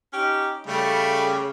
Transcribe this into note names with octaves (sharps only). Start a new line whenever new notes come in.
C#4 D#4 G4
C#3 G3 A3